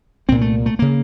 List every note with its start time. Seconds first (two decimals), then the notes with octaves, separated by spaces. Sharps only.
0.28 C2 A#2 C4
0.41 A3
0.66 A3
0.79 C#3 A#3